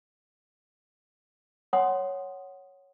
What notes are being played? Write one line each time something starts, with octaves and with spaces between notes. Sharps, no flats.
C#5 F#5 G#5 C6 D#6